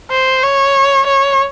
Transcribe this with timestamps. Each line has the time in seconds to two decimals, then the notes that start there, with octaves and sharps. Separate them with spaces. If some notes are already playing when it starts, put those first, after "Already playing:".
0.11 C5
0.44 C#5
1.07 C#5